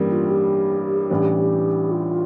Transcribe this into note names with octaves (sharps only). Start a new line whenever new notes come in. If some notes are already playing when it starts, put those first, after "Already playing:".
Already playing: A1 G2 G3 A#3
F4
G4
A1 A2 E3 G3 D4
F4